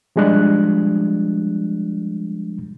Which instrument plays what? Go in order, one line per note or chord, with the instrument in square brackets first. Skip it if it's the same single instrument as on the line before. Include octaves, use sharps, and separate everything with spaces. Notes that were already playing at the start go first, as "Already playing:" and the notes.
[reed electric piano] F3 G3 G#3 D4 F#6